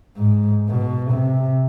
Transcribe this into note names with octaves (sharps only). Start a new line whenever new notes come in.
G#2
B2
C3